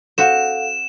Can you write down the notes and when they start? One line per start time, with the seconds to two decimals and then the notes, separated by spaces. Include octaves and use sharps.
0.18 C4 F#4 A4 F5 F#5 E7